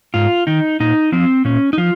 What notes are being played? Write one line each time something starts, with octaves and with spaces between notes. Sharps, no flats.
G#2 F4
D#3 D#4
A#2 D#4
F3 C4
A#2 C#4
D#4
F3 F4